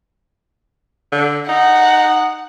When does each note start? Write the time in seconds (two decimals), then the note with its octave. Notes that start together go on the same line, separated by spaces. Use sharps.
1.12 D3
1.49 D#4 F#5